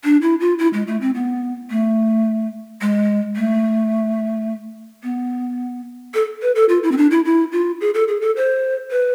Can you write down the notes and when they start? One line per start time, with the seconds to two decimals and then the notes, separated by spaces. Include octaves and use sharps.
0.04 D4
0.22 E4
0.40 F4
0.59 E4
0.73 G#3
0.87 A3
1.01 C4
1.15 B3
1.70 A3
2.81 G#3
3.36 A3
5.03 B3
6.14 A4
6.42 B4
6.55 A4
6.69 F4
6.83 E4
6.92 C4
6.97 D4
7.11 E4
7.25 E4
7.52 F4
7.81 G#4
7.94 A4
8.08 G#4
8.21 A4
8.36 C5
8.91 B4